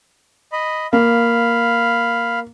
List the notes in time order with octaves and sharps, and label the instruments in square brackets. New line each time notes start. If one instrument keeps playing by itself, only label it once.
[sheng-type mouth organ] D#5 B5
[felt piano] A#3 [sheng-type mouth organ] F5 B5